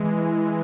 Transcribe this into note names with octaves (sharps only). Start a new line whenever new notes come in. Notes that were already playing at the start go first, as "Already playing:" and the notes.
Already playing: E3 G#3